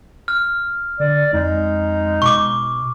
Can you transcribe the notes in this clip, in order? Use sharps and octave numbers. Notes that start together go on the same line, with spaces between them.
F6
D3 D5
F2 G#3 D#4
B2 C#6 D6